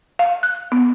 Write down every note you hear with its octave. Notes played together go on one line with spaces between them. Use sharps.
F5
F#6
B3